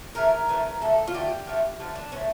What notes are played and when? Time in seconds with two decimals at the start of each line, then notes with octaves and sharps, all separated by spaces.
0.15 C#3 E3 A3 A#4
0.49 C#3 E3 A3
0.81 D3 A3 A4
1.07 F4
1.14 D3 A3 G4
1.47 D3 F3 A3
1.80 D3 F3 A3
1.95 D4
2.12 D3 A3 C#4